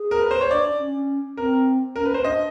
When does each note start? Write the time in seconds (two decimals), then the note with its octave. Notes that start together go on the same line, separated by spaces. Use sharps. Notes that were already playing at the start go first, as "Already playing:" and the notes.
Already playing: G#4
0.11 A#4
0.21 B4
0.31 C5
0.41 C#5
0.51 D4 D5
0.79 C#4
1.37 C4 A#4
1.96 C#4 A#4
2.05 B4
2.14 C5
2.24 D4 D#5